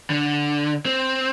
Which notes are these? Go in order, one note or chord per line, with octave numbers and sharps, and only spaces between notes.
D3
C4